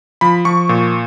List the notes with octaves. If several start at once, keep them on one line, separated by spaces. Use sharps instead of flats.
F3 B5
F3 C#6
A#2